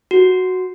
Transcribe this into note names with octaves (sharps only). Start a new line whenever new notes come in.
F#4